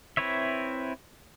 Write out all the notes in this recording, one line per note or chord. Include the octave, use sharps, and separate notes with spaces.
C4 E4 B4 C#5 E5